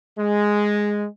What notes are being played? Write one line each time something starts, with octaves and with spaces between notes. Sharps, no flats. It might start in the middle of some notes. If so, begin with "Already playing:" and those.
G#3